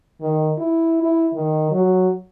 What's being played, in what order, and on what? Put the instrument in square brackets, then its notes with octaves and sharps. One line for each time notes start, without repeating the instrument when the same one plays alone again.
[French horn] D#3
E4
E4
D#3
F#3